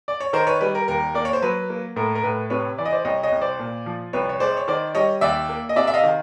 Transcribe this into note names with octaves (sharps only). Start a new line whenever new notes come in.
D5
C#5
D#3 A#4 C5
B4 C#5
G3 B4
A#4
D#2 A#4
A#3 D5
C#5
C5
F#3 B4
A#3
A2 A#4
A#4
A2 B4
C3 B4 C#5
E3 D5
D#5
C5 D5
C2 C#5 D#5
C#5 D#5
C2
C5 D5
A#2
F3
C2 B4 C#5
C#5
G#3 C5 D5
C#5
D#3 C5 D5
G3 C#5 D#5
D#2 D5 E5
A#3
D#5
C3 D5 E5
E5
D#5 F5
D#3